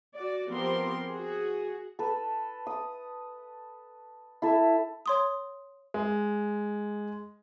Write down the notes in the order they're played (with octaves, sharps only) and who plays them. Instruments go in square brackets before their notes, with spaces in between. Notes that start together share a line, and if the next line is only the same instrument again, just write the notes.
[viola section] F#4 D5
F3 B3 C4 G4 A#4 C6
F#4 G#4
[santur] A4 B4
D#6
E4 A4 E5
[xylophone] C#5 C6 D#6
[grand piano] G#3